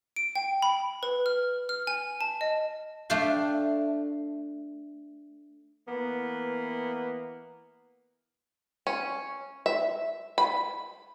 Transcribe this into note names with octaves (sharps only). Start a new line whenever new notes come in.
D7
G5
B5
B4
F6
F6
G#5
A5
D#5
A3 D4 D5 F5 G5
E3 A#3 B3
C#4
E5
B5